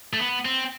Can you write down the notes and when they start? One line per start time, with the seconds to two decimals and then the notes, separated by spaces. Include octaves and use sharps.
0.13 A3
0.20 B3
0.45 C4